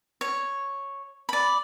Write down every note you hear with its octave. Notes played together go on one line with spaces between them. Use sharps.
C#5
D5 B5